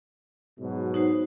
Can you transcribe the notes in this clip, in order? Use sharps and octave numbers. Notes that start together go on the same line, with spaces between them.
G#2 B2 F#3
D#4 F#4 C5